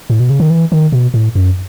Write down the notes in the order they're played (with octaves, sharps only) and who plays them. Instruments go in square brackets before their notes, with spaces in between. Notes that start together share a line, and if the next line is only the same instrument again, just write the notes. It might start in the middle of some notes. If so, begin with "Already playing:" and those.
[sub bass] A2
B2
C#3
D#3
E3
D#3
B2
A2
F#2